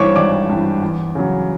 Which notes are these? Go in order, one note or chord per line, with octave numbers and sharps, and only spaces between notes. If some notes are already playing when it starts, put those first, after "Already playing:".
Already playing: G#1 G2 E3 C5 C#5 C#6 D6
G#1 D5 D6
G2 E3
E2
C#3 F#3